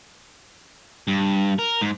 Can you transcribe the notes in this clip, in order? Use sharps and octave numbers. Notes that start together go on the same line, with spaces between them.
G2
A#4
G#2